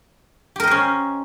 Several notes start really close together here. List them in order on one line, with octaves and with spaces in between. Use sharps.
G4 A#4 D#5 C5 C#4